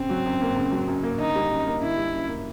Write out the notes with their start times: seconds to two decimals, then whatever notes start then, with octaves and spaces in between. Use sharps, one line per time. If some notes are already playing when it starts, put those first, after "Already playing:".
Already playing: C#3 C4
0.09 F#3
0.26 F#2
0.41 A#3
0.56 C#3
0.71 F#3
0.88 F#2
1.03 A#3
1.19 D3 D#4
1.35 G3
1.50 F#2
1.67 A#3
1.82 D3 E4
1.97 G3
2.14 F#2
2.28 A#3